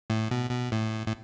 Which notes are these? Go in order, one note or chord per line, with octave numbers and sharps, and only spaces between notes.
A2
B2
B2
A2
A2